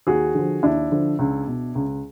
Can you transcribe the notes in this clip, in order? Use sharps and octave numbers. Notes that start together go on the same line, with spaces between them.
D#2 F#4 G#4
D3 F3
D#2 D4 E4
D3 F3
C#2
B2
C#2